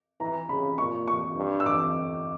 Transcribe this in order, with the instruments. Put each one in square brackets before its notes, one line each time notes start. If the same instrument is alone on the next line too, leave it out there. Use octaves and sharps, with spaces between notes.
[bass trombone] E3 [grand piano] A#5
[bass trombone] C#3 [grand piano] B5
[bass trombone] A#2 [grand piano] C#6
[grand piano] C#6
[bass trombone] G2
[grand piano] E6
D6